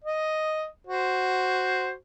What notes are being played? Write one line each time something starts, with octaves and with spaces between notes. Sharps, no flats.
D#5
F#4 C5